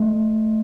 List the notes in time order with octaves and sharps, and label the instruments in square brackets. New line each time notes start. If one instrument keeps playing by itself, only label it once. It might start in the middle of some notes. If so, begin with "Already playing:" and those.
Already playing: [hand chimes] A3